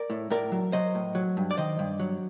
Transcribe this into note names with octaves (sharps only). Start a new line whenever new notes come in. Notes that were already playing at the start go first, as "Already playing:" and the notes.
Already playing: A#4 D5
A2
A2 A#4 D5
F#3
F#3 C5 D#5
A2
F#3
G2
D5
D#3 C5 D#5
G2
F#3